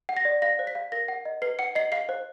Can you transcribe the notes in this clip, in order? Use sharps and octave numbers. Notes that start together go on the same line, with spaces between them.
F#5
A#6
D5
F5 A#6
C5
B6
F5
A#4 A#6
F#5
D#5
B4 C7
F#5 C#7
D#5 C7
F5 C7
C5